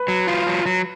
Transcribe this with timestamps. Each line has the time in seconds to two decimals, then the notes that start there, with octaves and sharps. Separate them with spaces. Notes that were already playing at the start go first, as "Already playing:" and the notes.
Already playing: B4
0.08 F#3
0.27 F4
0.47 F#3
0.66 F#3